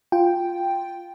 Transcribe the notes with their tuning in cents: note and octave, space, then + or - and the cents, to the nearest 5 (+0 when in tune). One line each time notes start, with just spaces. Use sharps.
F4 +0 G5 +0